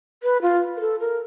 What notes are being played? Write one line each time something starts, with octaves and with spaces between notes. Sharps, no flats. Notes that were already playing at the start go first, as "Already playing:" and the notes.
B4
F4
A#4
A4
A#4